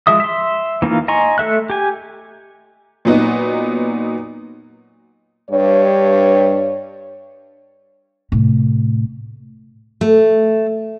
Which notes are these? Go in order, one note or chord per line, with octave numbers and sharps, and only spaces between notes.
F3 G#3 E5 D#6
E5 C6
E3 A#3 D#4 F4
D#5 G#5 A#5 C6 C#6
A3 A4 E5 F#6
G4 G#5
A#2 F#3 B3 D#4 F#4
G2 C#5
A2 C3
A3